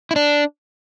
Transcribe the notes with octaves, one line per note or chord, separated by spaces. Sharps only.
E4
D4